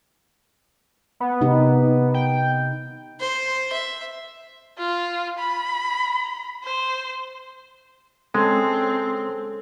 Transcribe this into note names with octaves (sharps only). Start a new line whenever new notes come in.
B3
C3 D#4 G4
G5
C5
E5
F4
B5
C5
G#3 C4 C#4 A4